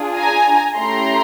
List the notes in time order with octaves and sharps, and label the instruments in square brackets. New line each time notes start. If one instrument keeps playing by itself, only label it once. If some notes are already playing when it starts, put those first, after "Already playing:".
Already playing: [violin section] D4 F4 G#4
G#5 A#5
A3 C#4 E4 G4 A#5 C6